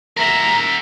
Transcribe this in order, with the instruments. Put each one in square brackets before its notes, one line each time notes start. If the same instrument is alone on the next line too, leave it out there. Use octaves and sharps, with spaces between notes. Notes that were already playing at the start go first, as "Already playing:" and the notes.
[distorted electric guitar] A#4 E5 [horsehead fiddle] A#5